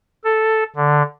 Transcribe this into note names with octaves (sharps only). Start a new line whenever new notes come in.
A4
D3